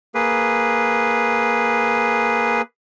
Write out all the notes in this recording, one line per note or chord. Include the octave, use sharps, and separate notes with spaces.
A#3 G#4 B4